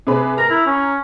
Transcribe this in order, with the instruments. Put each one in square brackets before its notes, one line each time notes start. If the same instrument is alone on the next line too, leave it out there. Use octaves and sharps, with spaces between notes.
[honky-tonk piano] C3 G#4 B4
[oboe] A#4 [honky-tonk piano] A#5
[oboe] E4
C#4